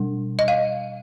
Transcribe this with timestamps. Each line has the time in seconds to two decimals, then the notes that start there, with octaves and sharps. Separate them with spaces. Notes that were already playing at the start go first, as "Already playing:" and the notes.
Already playing: B2 G3 D4
0.39 D#5
0.48 F5